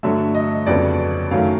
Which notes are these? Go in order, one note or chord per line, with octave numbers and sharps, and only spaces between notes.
G2 D3 F#3 A3 E5
D#5
F2 C#3 F#3 B3 D4 D5
F#2 D#3 F#3 A3 F5